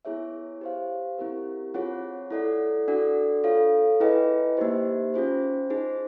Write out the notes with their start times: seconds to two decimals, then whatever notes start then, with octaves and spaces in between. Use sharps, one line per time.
0.05 B3 E4 G#4 C#5 E5
0.61 G4 C5 F5
1.18 C4 E4 G4 A#4
1.74 C4 F4 G#4 C#5 F#5
2.31 E4 A4 D5 F#5
2.88 D4 F#4 A4 D5 F#5
3.44 F4 A4 C#5 F5
4.00 E4 G#4 B4 D#5 G5
4.57 A#3 D#4 G4 C5
5.14 C#4 F4 G#4 C5
5.70 D#4 G#4 C5